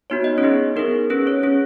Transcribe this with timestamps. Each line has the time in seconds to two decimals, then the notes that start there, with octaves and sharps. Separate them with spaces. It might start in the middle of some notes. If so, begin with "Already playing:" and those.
0.10 B3 D#4 F#4 C#5
0.24 D#5
0.38 C#4 C#5
0.43 B3 D#4 G#4
0.76 B3 D#4 G#4 A#4
1.10 C#4 G#4 B4
1.27 C#4 C#5
1.43 C#4 G#4